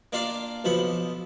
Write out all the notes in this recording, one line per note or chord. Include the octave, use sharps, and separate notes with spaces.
A#3 D4 F4 D5 F5
B1 F3 B3 B5